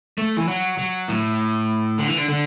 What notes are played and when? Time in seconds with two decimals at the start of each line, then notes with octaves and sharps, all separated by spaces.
0.18 A3
0.37 E3
0.48 F#3
0.78 F#3
1.08 A2
1.98 D3
2.08 E3
2.17 D3
2.29 D3